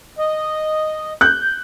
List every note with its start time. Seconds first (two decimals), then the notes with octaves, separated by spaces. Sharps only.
0.19 D#5
1.21 F#6 G6